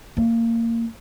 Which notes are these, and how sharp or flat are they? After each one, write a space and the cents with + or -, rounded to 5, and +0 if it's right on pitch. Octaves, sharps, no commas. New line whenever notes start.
A#3 -20